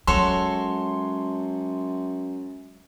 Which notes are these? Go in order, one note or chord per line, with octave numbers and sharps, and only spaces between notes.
F#2 F#3 G#3 F#4 A4 C#5 C6